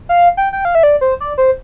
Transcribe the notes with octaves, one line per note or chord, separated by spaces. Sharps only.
F5
G5
G5
F5
E5
D5
C5
D5
C5